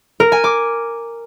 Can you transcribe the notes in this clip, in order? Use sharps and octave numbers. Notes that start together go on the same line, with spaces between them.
A#4
G#5
D6